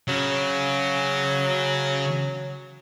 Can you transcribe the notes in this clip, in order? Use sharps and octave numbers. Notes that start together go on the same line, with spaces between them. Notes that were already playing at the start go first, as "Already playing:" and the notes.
C#3 F#3